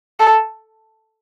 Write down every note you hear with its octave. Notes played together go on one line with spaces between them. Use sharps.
A4